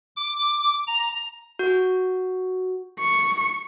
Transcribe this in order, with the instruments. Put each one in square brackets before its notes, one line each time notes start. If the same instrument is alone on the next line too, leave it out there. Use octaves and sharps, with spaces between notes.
[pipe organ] D6
A#5
[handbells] F#4
[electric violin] C#6